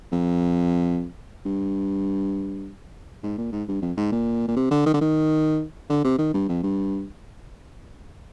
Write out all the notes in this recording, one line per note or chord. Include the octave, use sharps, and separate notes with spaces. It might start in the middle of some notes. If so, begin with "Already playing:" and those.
F2
G2
G#2
A#2
G#2
G2
F2
G#2
A#2
A#2
C3
D3
D#3
D3
D#3
D3
C3
D#3
G2
F2
G2